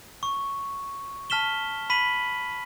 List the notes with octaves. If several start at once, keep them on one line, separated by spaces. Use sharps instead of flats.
C#6
A5 F6 B6 E7 G7
B5 B6 D#7 F#7